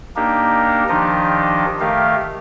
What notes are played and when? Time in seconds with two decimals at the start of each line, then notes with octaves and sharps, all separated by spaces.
0.16 A#3 D4 D#4 G4 A#4
0.89 D#3 F3 D4 D#4 G4 D#5
1.80 D#3 A3 G4 A#4 F5